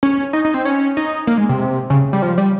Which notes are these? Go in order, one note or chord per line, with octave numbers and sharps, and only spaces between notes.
C#4
D#4
D#4
C4
C#4
D#4
A#3
G#3
C3
C#3
G3
F3
G3